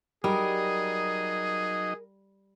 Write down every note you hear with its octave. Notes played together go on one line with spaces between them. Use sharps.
F#3 G3 D#4 G#4 A#4 D#5